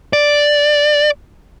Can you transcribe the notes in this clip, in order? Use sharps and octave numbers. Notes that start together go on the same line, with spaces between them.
D5